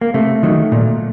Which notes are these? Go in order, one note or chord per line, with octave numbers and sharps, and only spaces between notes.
A#3
C3 A3
D#3 F#3
A#2